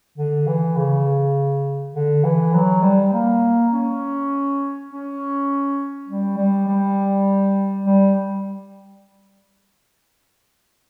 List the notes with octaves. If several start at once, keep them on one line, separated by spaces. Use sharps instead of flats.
D3
E3
C#3
D3
E3
F#3
G3
A#3
C#4
C#4
G3
G3
G3
G3